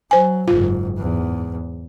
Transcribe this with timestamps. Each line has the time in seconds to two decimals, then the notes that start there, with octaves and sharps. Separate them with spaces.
0.11 F#3 C5 G#5
0.48 F#1 G#2 F4
0.98 E2 G#2